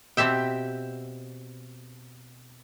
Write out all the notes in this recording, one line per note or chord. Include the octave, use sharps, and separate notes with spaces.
B2 C4 G4 E5 G5